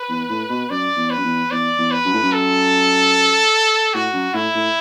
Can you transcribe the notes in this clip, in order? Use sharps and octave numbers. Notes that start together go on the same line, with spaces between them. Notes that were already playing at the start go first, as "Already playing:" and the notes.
Already playing: B4
E2
A2
B2
F#2 D5
E2
B4
F#2
E2
E2 D5
E2
B4
F#2
A2
F#2
A4
A2 F#4
F#2
A2 E4
A2